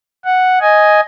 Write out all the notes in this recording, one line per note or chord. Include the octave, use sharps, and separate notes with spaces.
F#5
D#5 G#5